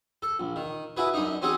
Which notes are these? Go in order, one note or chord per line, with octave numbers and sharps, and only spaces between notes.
A4
A#1
D#3
E4 F#4 G#4 B4
F#2 D4 D#4
C4 C#4 F#4 G#4 A4